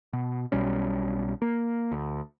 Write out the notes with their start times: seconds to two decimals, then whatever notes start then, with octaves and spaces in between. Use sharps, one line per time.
0.13 B2
0.52 B1 B2 G3 C#4
1.42 A#3
1.92 D2